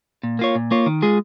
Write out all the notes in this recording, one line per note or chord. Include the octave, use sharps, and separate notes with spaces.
A#2
A#3 F4 C#5
A#2
A#3 F4 C#5
D#3
G#3 F4 G#4